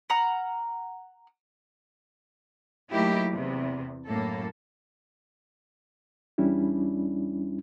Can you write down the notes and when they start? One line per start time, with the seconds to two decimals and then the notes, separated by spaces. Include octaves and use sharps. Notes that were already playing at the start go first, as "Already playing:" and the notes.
0.10 F#5 A#5 F6
2.92 F#3 A3 A#3 D#4 E4 G4
3.31 E2 C3
4.07 F#2 A2 A#3 A4
6.38 E2 G3 C#4 D4 E4